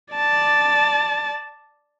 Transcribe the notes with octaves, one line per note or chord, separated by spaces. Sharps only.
D5 A5